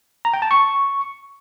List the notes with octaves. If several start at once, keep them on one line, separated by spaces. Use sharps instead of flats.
A#5
G5
A5
C#6